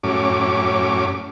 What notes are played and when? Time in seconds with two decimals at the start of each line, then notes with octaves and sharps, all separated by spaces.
0.03 F#2 A2 C#4 D6